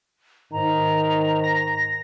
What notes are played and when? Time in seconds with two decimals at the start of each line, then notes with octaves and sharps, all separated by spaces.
0.52 G#2 D#3 A#5
1.44 A#6